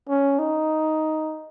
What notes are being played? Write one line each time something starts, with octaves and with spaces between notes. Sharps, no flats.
C#4
D#4